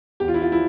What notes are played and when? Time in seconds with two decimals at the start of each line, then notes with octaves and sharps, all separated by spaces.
0.20 E2 G4
0.28 F4
0.34 E4
0.42 F4
0.52 F3 E4